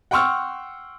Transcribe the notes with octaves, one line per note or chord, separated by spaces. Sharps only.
F#5 G5 C6 C#6 E6 F6